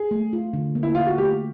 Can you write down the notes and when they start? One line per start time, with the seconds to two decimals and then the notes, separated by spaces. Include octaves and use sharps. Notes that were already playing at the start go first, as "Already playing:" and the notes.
Already playing: G#4
0.11 A3
0.33 F4
0.53 D3
0.75 A#3
0.83 E4
0.95 A#3 F4
1.07 F#4
1.18 A3 G4